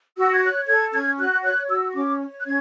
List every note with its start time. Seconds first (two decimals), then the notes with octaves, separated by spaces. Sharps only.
0.17 F#4 E6
0.33 G#6
0.42 C#5 F#6
0.67 A4 G#6
0.93 C#4 G#6
1.18 F#4 F#6
1.44 C#5 F#6
1.69 F#4 E6
1.90 C#6
1.94 C#4 D6
2.20 C#5
2.40 F#6
2.45 C#4 G#6